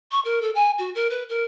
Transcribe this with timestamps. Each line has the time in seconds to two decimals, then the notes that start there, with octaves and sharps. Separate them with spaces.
0.11 C#6
0.24 A#4
0.41 A4
0.55 G#5
0.78 F#4
0.95 A#4
1.10 B4
1.29 A#4